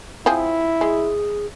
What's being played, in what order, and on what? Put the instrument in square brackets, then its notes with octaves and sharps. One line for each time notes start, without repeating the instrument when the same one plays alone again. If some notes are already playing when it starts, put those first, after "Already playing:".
[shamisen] F3 C4 G#4 [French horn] E4
[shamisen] G#3 [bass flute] G#4